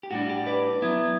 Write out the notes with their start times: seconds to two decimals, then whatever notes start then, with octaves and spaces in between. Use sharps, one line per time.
0.03 G4
0.11 A2 G3 D4 F#4
0.29 G4
0.46 B4 D5
0.82 F#3 B3 E4